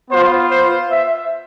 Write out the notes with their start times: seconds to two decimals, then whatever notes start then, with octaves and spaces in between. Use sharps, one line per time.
0.10 B3 F4 C5
0.50 C5
0.91 E5